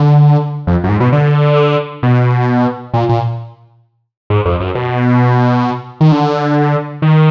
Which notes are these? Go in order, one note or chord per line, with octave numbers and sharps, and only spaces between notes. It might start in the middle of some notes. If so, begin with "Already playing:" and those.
Already playing: D3
F2
F#2
G#2
B2
D3
B2
A#2
A#2
G#2
F2
F#2
B2
D#3
D3
D#3